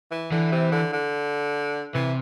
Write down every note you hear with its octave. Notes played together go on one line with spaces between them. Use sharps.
E3
D3 E3
C3
D3
D3
C3 E3